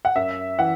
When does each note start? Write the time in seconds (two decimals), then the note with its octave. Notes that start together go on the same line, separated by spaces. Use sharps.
0.05 F#5
0.16 F#2 E5
0.59 E3 F#5